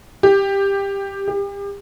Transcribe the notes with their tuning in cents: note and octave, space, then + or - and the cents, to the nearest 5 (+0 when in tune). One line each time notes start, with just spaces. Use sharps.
G4 +10
G4 +35